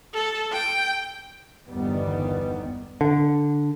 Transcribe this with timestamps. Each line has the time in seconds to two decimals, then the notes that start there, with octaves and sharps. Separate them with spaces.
0.14 A4
0.52 G5
1.69 G1 E2 D#3 G3 B3
3.01 D3